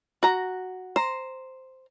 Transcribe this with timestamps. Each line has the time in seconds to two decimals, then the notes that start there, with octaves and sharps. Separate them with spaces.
0.23 F#4 A#5
0.96 C5 A#5